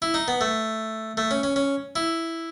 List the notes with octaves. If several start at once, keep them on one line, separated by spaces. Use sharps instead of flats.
E4
D#4
B3
A3
A3
C#4
C#4
C#4
E4